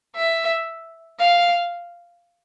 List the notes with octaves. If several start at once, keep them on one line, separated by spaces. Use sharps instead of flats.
E5
F5